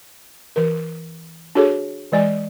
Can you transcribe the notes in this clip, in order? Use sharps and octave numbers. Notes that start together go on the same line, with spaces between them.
E3 A#4
D4 F#4 G#4 A4 C#5
E3 G#3 D5 G#5